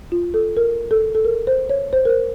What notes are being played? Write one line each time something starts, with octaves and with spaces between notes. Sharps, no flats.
F4
A4
A#4
A4
A4
A#4
C5
C#5
C5
A#4
C5